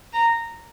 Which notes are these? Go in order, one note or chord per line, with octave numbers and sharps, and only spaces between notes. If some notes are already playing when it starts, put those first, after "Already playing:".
A#5